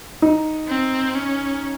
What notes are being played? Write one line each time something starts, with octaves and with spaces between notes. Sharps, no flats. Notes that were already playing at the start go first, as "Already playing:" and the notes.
D#4
C4
C#4